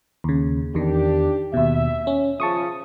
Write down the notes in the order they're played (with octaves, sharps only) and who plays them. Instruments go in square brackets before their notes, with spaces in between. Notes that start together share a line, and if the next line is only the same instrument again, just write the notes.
[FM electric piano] D#2 C#3
[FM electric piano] E2 D#3 [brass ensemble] D4 G4
[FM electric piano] D#2 B2 [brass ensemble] E5
[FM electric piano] C#4
[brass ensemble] C#3 F3 [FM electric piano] A5 C#6 D#6